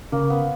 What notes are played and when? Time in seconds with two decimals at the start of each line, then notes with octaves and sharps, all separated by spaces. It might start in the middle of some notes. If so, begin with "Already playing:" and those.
0.12 C#3 A#3
0.30 B3